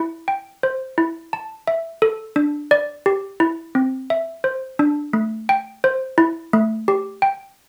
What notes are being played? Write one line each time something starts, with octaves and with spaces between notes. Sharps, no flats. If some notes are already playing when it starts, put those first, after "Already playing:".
Already playing: E4
G5
C5
E4
A5
E5
A4
D4
D5
G4
E4
C4
E5
C5
D4
A3
G5
C5
E4
A3
G4
G5